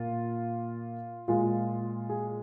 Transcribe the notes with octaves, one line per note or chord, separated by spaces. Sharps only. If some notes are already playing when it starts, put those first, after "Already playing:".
Already playing: A#2 A#3 F4
A#2 G#3 F4
G#4